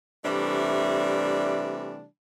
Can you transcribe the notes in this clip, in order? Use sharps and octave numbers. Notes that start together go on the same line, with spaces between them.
C3 E3 G3 A3 D4